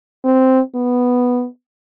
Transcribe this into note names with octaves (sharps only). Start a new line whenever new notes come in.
C4
B3